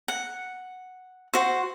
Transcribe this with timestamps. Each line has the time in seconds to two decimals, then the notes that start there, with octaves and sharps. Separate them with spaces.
0.08 F#5
1.34 F#4 C5